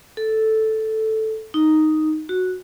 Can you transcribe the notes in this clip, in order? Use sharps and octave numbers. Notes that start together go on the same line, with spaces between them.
A4
D#4
F#4